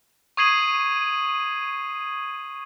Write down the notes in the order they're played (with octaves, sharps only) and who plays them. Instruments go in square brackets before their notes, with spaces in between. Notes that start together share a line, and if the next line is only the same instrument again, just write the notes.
[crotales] C#6 D#6 G#6 C7 D#7 F#7